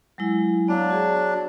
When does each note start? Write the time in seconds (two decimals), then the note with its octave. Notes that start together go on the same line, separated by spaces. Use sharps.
0.18 F#3 G#3 E4
0.68 F#3 B3 D4 F5
0.90 F#4 G#4